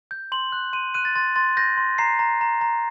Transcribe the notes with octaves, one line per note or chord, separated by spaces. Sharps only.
G6
C6 F#7
F#6
C6 D#7
F#6 D#7
A6
C6 A6
C6 A6
G6 A#6
C6
A#5 C7
A#5
A#5
A#5